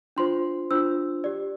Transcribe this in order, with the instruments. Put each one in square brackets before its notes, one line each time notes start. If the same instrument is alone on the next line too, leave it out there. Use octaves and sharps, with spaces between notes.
[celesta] D4 F4 C5 C6
D4 F4 C5 E6
G4 D5